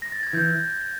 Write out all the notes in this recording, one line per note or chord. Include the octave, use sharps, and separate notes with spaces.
A#6
A6
G#6
E3 G6